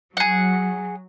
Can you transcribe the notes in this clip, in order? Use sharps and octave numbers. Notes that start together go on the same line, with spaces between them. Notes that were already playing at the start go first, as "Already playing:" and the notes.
F#3 G#4 F#5